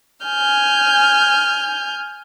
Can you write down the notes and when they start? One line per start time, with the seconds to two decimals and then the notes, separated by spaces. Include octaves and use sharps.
0.24 G#5 F6 G6